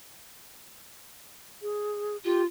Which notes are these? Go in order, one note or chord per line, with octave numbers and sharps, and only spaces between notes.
G#4
F4 G4